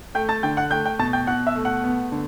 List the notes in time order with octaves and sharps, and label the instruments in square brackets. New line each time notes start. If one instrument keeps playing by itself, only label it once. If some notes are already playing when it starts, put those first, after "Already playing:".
[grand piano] A3 G5 G6
A5 A6
D3 G5 G6
F#5 F#6
A3 G5 G6
G5 G6
B2 A5 A6
G5 G6
B2 F#5 F#6
E5 E6
A3
F#5 F#6
B3
D3